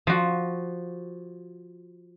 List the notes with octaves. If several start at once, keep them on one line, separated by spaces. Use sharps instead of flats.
F3 F#4